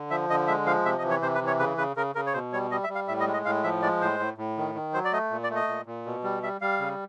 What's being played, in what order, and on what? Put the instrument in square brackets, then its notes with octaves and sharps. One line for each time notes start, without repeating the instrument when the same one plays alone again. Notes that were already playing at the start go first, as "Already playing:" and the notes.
Already playing: [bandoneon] D3
F3 E5
D3 D#5
G#3 E5
F3 F5
C3 E5
D#5
E3
C#5
C3 C5
B4
E3
C#5
C#3 B4
C#3 B4
C#3 A#4
C#3 A#4
C#5
B2 C5
G3 C#5
G3 D#5
E5
G3
F5
A2 E5
D#5
G#3
D#5
A2 F5
F3 E5
G#3 D5
A2 C5
A2
A2
D#3
D#3
F#3 C5
D5
A3 D#5
A#2
D5
A3
D#5
A#2
A#2
B2
G3
G3 E5
G3 F5
C#3